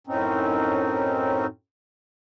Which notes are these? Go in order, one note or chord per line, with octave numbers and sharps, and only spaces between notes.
F#2 A2 C4 C#4 D#4